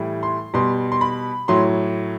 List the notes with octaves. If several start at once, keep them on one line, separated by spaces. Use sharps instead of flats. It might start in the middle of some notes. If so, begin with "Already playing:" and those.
Already playing: A2 E3 G3
C6
B2 G3 C6
C6
B5
A2 F#3 C6